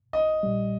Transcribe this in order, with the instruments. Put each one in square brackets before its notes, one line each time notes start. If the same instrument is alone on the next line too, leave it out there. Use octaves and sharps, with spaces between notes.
[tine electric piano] A#1 [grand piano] D#5
[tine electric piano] A#2 G3